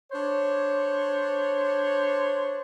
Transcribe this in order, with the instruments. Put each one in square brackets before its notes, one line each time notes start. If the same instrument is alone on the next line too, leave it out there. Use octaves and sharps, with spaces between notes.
[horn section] D4 C5 C#5